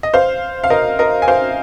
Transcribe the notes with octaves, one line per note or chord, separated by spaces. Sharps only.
D#5
C5 F5
F5
A#4 D#5
A#4 D#5
G#5
C5 F5